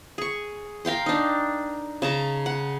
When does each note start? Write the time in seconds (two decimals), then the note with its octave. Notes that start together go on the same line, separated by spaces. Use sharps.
0.18 G#4 C#6
0.85 A#4 F5 G5 C6
1.06 D4 D#4
2.02 C#3 A5 A#5
2.46 F#5